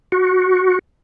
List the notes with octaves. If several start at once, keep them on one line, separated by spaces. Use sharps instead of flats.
F#4